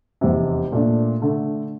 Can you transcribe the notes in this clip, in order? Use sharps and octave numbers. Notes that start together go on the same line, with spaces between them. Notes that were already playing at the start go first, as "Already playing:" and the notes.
F1 E2 C3
A#2 A3 D4
D3 A3